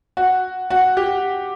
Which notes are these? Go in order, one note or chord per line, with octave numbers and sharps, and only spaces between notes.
F#4
F#4
G4